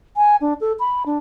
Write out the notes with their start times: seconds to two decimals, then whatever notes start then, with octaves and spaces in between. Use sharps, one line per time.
0.17 G#5
0.41 D4
0.61 A4
0.80 B5
1.06 D4